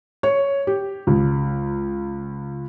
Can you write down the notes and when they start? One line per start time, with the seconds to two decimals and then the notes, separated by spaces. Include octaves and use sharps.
0.23 C#5
0.67 G4
1.07 C#2